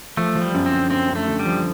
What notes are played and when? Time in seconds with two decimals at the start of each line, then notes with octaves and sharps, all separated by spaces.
0.17 F3 A3
0.35 F3
0.42 G3
0.54 F#2
0.66 C4
0.72 D3
0.90 F#2 C4
1.09 F#2
1.15 A3
1.27 D3
1.39 G3
1.46 F3